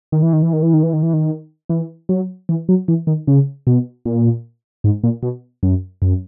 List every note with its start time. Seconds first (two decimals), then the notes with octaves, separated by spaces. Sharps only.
0.12 D#3
0.23 E3
0.33 D#3
0.42 E3
0.53 D#3
0.63 E3
0.74 D#3
0.83 E3
0.93 D#3
1.03 E3
1.13 D#3
1.69 E3
2.09 F#3
2.49 E3
2.69 F#3
2.88 E3
3.07 D#3
3.27 C#3
3.67 B2
4.05 A#2
4.84 G#2
5.04 A#2
5.23 B2
5.63 F#2
6.02 F#2